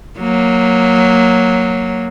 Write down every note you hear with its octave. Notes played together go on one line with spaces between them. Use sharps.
F#3 A#3